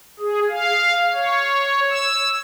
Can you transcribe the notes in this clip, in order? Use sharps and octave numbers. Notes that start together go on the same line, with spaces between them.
G#4
F5
C#5
E6